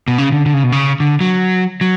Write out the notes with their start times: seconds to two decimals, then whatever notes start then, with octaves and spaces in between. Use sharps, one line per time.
0.08 B2
0.18 C#3
0.32 D3
0.46 D3
0.54 C#3
0.63 B2
0.72 C#3
1.00 D3
1.21 F#3
1.81 F#3